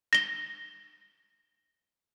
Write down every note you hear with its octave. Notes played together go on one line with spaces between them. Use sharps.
A#6 G7